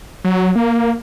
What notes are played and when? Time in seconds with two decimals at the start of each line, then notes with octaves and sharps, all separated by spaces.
0.25 F#3
0.56 A#3